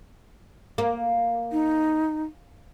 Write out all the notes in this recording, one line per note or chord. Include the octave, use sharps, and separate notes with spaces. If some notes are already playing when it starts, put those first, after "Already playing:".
A#3
D#4